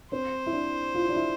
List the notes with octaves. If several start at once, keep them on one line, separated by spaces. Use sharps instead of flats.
C4 C5
E4
D4
F4
E4
D4
E4